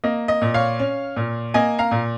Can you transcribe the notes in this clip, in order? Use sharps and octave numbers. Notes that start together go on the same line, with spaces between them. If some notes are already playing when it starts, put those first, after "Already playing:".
A#3 D#5
D#5
A#2
C#5 F5
C#4
A#2
A#3 D#5 G#5
F5 A#5
A#2